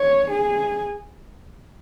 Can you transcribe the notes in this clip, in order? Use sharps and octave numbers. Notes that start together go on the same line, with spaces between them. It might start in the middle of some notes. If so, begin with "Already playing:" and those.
Already playing: C#5
G#4